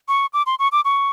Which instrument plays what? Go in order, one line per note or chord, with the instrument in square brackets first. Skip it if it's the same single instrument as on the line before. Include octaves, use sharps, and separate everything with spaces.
[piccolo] C#6
D6
C6
C#6
D6
C#6